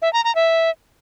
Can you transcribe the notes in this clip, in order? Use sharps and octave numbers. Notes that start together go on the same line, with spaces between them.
E5
A#5
A#5
E5